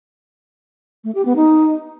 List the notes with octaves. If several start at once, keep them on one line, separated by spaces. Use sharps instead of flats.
A3
G4
B3
D#4